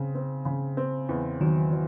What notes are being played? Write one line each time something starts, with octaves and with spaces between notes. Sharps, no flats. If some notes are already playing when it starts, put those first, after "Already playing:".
Already playing: C#3 C4
C4
C#3
C4
E2
D#3 F#3
F#3